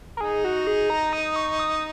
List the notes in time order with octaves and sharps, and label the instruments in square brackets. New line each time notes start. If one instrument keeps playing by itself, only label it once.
[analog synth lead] A#4
[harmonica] D#4 [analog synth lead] G#4
[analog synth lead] F#4
G#4
A#5
D#6
C#6
D#6